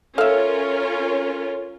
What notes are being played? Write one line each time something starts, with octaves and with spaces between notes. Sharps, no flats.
C#4 F4 A4 A#4 E5 F5